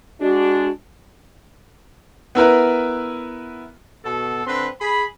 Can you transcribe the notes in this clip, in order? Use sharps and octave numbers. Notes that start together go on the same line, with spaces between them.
G#3 D4 F#4
B3 E4 A#4 B4
B2 A4
D3 C4 B4 C6
G#4 B5